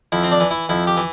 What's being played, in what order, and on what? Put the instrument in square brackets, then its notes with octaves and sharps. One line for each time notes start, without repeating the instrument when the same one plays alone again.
[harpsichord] F2 E4
C4
D4
E3
E4
F2 E4
G4
E3